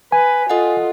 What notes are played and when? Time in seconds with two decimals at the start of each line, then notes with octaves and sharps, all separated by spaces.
0.12 B4 G#5
0.50 F4 A4 D#5 F#5